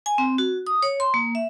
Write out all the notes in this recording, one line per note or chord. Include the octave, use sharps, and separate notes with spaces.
G#5
C4
F#4
D#6
C#5
C6
A#3
E5